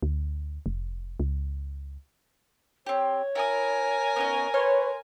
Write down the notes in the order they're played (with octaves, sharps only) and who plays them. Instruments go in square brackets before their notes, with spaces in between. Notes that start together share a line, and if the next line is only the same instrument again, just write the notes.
[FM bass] D2
F1
C#2
[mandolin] C4 G4 [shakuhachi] C#5
[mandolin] E4 D#6 [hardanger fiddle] A#4 G#5
[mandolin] B3 C#4 D#4
[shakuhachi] B4 [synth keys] C#5 [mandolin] C6 F6